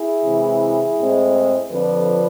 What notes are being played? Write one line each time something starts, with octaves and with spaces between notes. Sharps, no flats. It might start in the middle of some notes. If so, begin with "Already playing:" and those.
Already playing: E4 G#4
C3 E3 G#3
A2 G#3 C4
F2 D3 F3 B4 D5